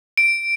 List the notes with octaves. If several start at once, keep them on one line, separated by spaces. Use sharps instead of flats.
D7